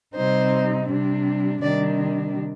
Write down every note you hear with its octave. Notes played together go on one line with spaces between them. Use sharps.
C3 G3 C4 D#4 C5
C3 G3 D4
C3 D#3 G3 D4 D5